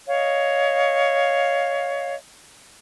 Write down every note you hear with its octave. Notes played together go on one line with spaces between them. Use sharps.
C#5 D#5 F5